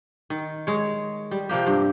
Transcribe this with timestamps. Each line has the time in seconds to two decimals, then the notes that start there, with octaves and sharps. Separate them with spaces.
0.30 D#3
0.67 G#3 C#5
1.31 G3
1.49 C3 F3 A#3 G4
1.67 G2